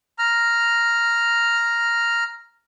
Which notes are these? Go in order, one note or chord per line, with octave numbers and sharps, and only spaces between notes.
A#5 F6